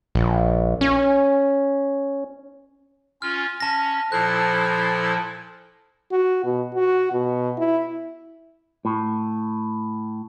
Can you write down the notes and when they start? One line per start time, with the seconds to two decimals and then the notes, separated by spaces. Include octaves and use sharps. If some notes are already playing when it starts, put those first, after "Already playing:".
0.15 A#1
0.81 C#4
3.22 C#4 F4 F6
3.60 C#4 A5 A#6
4.12 A#2 F3 E4 A4 C5 F#6
6.12 F#4
6.44 B2
6.75 F#4
7.13 B2
7.58 E4
8.85 A2